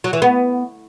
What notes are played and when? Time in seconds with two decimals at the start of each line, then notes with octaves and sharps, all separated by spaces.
0.04 F#3
0.13 E3
0.22 B3